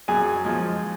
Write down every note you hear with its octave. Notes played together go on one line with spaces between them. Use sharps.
F#2 G#4 G#5
F3 G#3